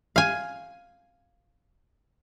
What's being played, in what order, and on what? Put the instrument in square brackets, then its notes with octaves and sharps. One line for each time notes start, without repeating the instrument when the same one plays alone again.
[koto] F5 G#5